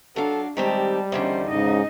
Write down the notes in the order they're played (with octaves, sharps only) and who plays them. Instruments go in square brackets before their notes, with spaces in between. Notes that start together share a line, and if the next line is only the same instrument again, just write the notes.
[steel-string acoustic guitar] F#3 F5 [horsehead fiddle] D4 [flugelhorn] A4
[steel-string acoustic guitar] D#3 C4 G4 [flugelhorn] G3 [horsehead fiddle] G#3 A5
[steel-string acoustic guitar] E2 D3 D#3 [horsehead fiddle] C#4 C5
[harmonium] G#2 C#3 [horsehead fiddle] D#4 D#5